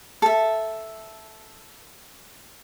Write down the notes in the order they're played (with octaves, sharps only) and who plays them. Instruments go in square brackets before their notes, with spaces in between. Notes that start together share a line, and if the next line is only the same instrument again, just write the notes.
[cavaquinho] A4 E5